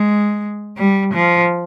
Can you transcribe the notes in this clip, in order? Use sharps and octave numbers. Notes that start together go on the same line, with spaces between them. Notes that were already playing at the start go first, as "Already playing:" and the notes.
Already playing: G#3
G3
F3